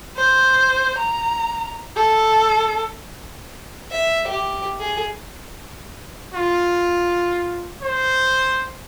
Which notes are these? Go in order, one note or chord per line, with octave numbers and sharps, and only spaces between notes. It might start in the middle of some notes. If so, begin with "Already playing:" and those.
C5
A#5
A4
E5
G4
G#4
F4
C5